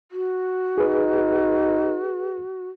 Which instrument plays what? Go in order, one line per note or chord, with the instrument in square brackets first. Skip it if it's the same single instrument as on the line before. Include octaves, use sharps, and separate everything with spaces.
[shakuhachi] F#4
[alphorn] D#4 [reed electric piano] G#4 B4